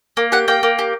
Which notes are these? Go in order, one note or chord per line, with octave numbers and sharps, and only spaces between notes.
A#3
G4 F#5
A#3 G5
A#3
G4